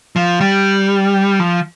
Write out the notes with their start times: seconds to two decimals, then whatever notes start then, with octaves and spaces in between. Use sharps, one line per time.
0.16 F3
0.41 G3
1.40 F3